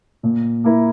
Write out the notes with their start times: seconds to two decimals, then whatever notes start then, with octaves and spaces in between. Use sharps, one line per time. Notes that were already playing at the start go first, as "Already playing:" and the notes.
0.23 A#2
0.64 A#3 E4 A#4